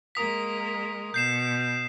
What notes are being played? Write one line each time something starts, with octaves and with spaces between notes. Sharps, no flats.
G#3 A#3 A#4 D#6 B6
B2 G6 C7 E7